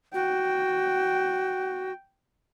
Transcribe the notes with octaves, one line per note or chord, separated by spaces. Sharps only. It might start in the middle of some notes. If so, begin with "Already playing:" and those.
F#4 G5